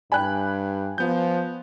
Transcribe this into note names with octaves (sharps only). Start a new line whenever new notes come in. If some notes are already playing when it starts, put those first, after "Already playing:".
G2 D5 G5 G#5 B5 F#6
F3 B3 G6